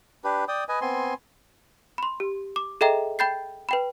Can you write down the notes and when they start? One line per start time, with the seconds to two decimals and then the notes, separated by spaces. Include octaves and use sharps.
0.24 D4 G4 B4
0.48 D5 G5 D#6
0.69 B4 D#5 G#5
0.81 B3 C4 G#5 C6
1.98 B5 C6
2.20 G4
2.56 D6
2.81 G#4 A4 D#5 E5 G5 A#5
3.19 G5 B5 G6 A6 C7
3.69 B4 G5 B5